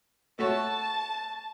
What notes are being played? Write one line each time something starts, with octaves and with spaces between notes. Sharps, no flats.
A3 F#4 C#5 A5